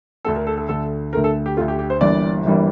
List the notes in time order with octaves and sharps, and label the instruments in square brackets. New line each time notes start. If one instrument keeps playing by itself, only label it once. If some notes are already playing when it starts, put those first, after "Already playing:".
[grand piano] D2 D3 A3 A4
A#4
A4
A4
D2 D3 A3 A4
D2 D3 A3 A#4
A4
G4
D2 D3 A3 F4
G4
G4
C5
G1 G2 E3 G3 A#3 D5
G1 G2 E3 G3 A#3